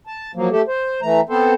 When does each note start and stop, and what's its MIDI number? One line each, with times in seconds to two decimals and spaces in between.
0.07 0.31 81
0.35 0.49 53
0.35 0.49 54
0.35 0.49 58
0.51 0.62 57
0.51 0.62 67
0.51 0.62 69
0.68 1.00 72
1.02 1.20 52
1.02 1.20 57
1.02 1.20 82
1.29 1.54 59
1.29 1.54 60
1.29 1.54 69
1.29 1.54 72